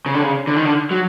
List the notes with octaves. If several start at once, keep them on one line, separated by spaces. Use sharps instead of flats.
C#3
D3
C#3
D3
D#3
D3
F#3